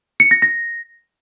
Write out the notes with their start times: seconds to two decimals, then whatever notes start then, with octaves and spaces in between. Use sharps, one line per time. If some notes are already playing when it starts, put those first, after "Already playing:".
0.20 C#7
0.31 A#6
0.42 A#6